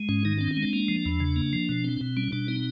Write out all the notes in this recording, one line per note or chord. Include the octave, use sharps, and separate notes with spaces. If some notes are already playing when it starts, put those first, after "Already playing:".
Already playing: G#3
G#2 C#4
D#3 D#4
C4 D4
C#4
G#3
D4
A#3
F3
E2
C#3
A#3
F3
B2
C4
B2
G3 C#4
B2 D4
C4 D#4